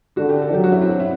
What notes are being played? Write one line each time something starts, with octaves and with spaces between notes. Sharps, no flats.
D3 F#4
G4
A4
F#3 G4
F#4
E4
C4
D4
E4